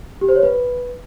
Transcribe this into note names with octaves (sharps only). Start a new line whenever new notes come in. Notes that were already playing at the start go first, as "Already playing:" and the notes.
G4
C5
C#5
B4